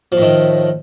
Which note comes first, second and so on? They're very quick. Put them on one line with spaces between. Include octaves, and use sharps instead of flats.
F3 A2 D#3